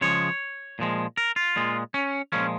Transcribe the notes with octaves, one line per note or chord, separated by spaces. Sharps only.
C#3 F3 G#3 C#5
A#2 F3 G#3
A#4
F4
A#2 G#3
C#4
A#2 F3 G#3 C#4